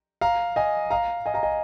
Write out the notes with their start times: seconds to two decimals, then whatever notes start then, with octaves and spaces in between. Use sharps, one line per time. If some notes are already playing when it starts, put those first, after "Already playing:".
0.21 F5 A#5
0.56 D#5 G#5
0.91 F5 A#5
1.26 D#5 G#5
1.34 F5 A#5
1.43 D#5 G#5